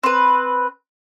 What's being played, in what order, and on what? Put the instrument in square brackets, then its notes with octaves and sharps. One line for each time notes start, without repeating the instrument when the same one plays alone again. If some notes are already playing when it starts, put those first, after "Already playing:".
[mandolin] C4 B4